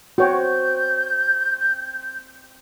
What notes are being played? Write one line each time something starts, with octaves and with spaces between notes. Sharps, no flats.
C4 F#4 C#5 D5 G5 C#6 G6